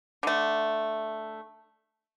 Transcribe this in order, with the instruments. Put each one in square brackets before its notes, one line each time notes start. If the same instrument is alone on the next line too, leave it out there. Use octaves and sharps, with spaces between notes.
[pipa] D3 A3